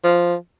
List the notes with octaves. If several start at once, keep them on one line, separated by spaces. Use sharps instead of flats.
F3